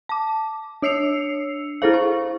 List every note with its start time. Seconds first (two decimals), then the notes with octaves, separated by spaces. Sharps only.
0.09 A5 D6
0.82 D4 C#5 E6 C7 C#7 F7
1.82 E4 G#4 A4 C5 F5
1.94 C#6